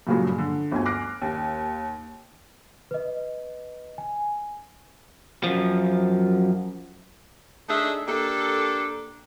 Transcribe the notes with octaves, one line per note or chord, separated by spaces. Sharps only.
G2 A#2 C#3 F3 F#3 G#3
D3
G1 D2 G#5
D6 F6 F#6 A#6 C7 D7
D#2
B4 D#5
G#5
F#2 F3
A3 D4 D#4 G#4 D#5 E5
A#3 D4 G4 A4